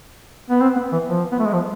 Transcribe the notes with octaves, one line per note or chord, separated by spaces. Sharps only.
B3
C4
B3
E3
F3
B3
A3
G#3
F3